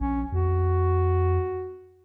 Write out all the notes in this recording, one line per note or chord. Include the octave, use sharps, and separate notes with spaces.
A#1 C#4
F2 F#4